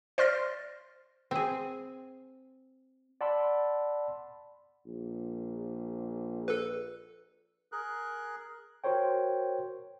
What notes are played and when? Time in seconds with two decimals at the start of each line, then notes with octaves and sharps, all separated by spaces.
0.18 C5 D5 C6 F6 A6 A#6
1.31 C4 G#4
3.21 D5 F#5 A5 B5 C6 E6
4.86 A#1
6.48 A4 B4
7.72 G#4 A#4 F#6
8.84 F#4 A#4 C5 C#5 G5